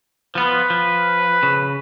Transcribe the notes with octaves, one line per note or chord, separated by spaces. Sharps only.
F3 B3 F4 B4
F3
C#3